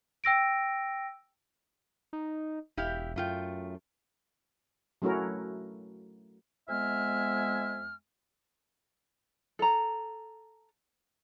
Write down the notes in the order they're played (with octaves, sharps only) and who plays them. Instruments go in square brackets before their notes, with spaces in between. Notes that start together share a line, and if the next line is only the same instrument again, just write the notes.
[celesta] G5 E6 A#6 D7
[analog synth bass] D#4
[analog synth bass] E1 [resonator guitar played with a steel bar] E4 G4 F5
[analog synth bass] F#2 [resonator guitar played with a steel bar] A3 F4 G5
[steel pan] F#3 A3 C#4 E4 F#4 A#4
[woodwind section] F2 G#3 B3 E5 G#5 F6
[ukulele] A4 A#5